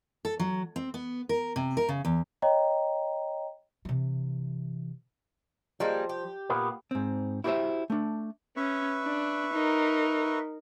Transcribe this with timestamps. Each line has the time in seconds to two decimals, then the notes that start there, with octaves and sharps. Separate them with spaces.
0.25 A4
0.40 F#3
0.76 C4
0.94 B3
1.29 A#4
1.56 C3
1.77 A#4
1.89 C#3
2.05 E2
2.42 C#5 D#5 G5 A#5
3.85 C3 E3
5.80 F3 G3 G#3 A#3
6.09 G4
6.50 A#2 A#3 B3
6.91 G#2 C4
7.44 E4 F#4 G4 A#4 C5 E5
7.90 A3 D4
8.57 C#4 B4 E5 C#6
9.04 D4
9.53 D#4 A#4